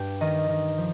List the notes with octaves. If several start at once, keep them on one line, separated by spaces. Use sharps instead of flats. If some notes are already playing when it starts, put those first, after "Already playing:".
Already playing: G2 G4
D#3 D#5
D#3
F3